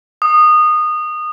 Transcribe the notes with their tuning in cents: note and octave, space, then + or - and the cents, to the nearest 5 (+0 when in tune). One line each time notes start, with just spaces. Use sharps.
D#6 -20